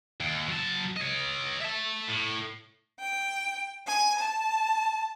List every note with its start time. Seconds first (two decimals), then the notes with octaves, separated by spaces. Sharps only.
0.20 D#2
0.49 F#3 A5
0.97 C#5 D#5
1.61 E5 A5
2.08 A2
3.00 G5
3.87 G#5
4.18 A5